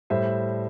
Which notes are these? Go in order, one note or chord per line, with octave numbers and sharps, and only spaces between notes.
A2 G3 C5 E5